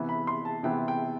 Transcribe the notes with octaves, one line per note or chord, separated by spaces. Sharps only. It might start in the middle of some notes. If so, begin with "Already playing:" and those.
Already playing: C3 E3 B3
B5
C6
A5
C3 E3 B3 G5
G5